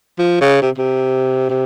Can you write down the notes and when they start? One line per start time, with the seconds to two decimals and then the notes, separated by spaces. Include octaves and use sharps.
0.19 F3
0.41 C#3
0.62 C3
0.78 C3
1.50 C3